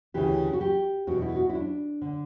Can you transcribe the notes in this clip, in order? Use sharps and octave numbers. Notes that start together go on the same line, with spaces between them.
D2 C#3 E3 G4
F#4
G4
E2 B2 F#4
E4
F#4
E4
D4
D3